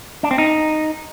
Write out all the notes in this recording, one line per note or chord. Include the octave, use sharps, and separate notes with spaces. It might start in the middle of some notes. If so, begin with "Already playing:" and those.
D4
C4
D#4